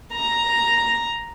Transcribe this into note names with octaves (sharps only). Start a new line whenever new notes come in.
A#5